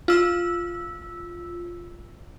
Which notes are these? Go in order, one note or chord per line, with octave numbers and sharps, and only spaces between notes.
F4 E6